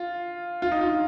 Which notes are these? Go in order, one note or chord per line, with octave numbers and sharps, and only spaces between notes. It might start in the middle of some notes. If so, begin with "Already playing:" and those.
Already playing: F4
F4
D#4
F4